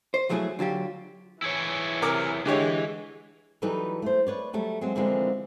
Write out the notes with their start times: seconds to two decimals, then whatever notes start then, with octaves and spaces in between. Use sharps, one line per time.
0.14 C5
0.29 F3 F#3 A3 E4 G#4
0.59 D3 F#3 F4 G4
1.42 E3 E4 G#4 C#5
2.02 C3 A#4 D6
2.45 D3 E3 G#3 G4 C#5
3.62 E3 F#3 G3 D#4 A4 B4
4.02 A3 C5
4.27 B4 C#5 D5
4.53 F#3 G3 A3
4.81 F#3 G#3 C4
4.95 D3 E3 F3 G#3 A#3 C4